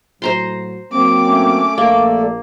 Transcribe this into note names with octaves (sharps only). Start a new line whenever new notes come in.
A2 F#3 C5 A#5 C6
F#3 A#3 C4 D6
A3 C#4
A#1 A3 A#3 A4 D5